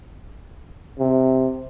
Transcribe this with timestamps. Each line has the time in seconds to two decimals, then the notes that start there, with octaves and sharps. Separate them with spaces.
0.99 C3